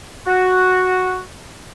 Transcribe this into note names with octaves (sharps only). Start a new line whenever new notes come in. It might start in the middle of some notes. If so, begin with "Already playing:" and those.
F#4